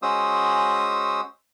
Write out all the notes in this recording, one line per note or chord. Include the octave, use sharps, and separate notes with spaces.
G#3 C#4 F#4 C5 D#6 E6